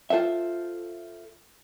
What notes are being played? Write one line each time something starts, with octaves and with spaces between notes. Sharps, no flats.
F4 A4 C5 E5